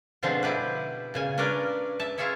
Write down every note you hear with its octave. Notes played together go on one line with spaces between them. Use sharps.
B2 D3 F3 G#3 C4
E4 G4 B4
A#2 C#3 G#5
C#4 D4 A#4 B4 D5
E5 A5
E4 F4 G#4 C#5 E5